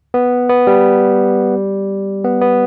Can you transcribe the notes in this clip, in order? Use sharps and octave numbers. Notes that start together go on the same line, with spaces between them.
B3
B3
G3
B3
B3